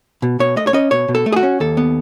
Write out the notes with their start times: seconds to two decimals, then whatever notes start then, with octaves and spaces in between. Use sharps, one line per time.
0.22 B2
0.39 B2 C#5
0.56 A3 D#5
0.67 C#5
0.73 C#4 D#5
0.91 B2 C#5
1.08 B2
1.15 A4
1.26 A3
1.32 G#4
1.36 F#4
1.43 C#4
1.60 D#2 A4
1.77 B3